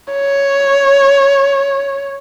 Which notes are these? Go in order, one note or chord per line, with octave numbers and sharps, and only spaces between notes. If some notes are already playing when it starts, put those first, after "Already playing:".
C#5